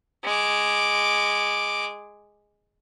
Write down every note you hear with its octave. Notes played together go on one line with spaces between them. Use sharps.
G#3 D6